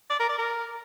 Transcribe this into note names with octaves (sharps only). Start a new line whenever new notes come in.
D5
A#4
D5
A#4